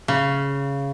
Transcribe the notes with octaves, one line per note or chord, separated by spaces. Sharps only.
C#3